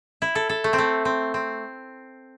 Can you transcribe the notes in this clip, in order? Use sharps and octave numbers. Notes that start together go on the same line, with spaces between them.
E4
A4
A4
A3
C4
A3
C4
C4